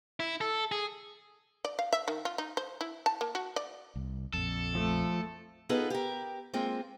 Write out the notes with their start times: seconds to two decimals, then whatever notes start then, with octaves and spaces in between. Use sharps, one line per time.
0.20 E4
0.41 A4
0.72 G#4
1.65 D5
1.79 F5
1.93 E5
2.08 D#3
2.25 F4
2.38 D#4
2.57 C5
2.81 E4
3.06 A5
3.21 A#3
3.35 F#4
3.56 D5
3.96 C2
4.34 A#1 F2 A4
4.75 F3 A3
5.69 B3 D#4 F4 G#4 A4 B4
5.90 G4 A#4
6.54 G#3 A#3 C4 F4